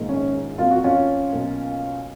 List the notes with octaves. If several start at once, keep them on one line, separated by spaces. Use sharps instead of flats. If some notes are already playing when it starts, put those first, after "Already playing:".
Already playing: A#1 G#2 D#3 A#3
C#4
F2 F3 A#3 F4
F#4
C#4 F4
B1 B2 A#3